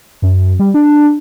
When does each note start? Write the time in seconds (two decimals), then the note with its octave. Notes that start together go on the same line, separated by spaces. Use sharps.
0.22 F#2
0.59 G3
0.74 D4